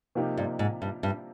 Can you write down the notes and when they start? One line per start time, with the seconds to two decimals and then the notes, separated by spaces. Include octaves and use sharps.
0.15 C3 F3 A#3 D#4 G4
0.37 G2
0.59 G#2
0.82 G2
1.03 G2